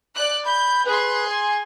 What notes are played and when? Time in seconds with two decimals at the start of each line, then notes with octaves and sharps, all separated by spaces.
0.15 D5 F#6
0.45 B5 G6
0.85 G#4 B4 C6
1.28 G#5